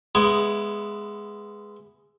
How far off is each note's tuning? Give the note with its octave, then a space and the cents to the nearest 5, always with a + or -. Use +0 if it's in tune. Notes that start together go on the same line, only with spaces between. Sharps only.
G#3 +0 B3 +0 E4 +15